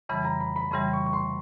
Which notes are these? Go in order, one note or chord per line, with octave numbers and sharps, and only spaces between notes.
F2 C#3 E3 G3 B5
A#5
B5
B5
F2 C#3 E3 G3 C6
C#6
C#6
C6